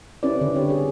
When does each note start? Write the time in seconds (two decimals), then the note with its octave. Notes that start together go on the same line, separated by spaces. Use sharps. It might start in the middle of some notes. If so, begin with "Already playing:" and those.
0.23 C4 C#4 E4 G4 B4 D5
0.41 D3
0.56 G4 C#5
0.70 G#4